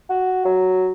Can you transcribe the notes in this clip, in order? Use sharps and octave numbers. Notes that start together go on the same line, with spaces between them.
F#4
F#3